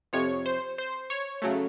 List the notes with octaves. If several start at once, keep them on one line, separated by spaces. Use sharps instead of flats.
F2 C3 F3 C#5
C5
C5
C#5
C#3 F#3 A3